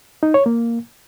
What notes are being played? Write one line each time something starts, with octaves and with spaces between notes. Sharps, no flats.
D#4
C#5
A#3